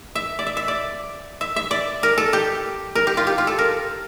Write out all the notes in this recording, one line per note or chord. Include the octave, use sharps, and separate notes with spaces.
E5
D5
E5
E5
D5
E5
E5
D5
A#4
A4
G4
A#4
G4
F4
G4
F4
A4
A#4